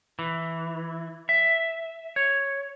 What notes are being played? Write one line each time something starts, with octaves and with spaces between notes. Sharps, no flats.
E3
E5
C#5